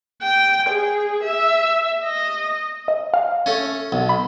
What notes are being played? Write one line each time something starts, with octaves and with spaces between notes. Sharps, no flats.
G5
G#4
E5
D#5
D#5
F5
A3 C#4
B1
B5